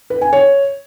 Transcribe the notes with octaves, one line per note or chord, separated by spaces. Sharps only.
B4
G#5
C#5